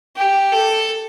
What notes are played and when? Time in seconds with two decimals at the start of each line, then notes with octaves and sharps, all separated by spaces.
0.16 G4
0.52 A4